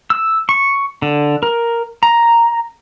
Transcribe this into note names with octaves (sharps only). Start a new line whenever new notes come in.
E6
C#6
D3
A#4
A#5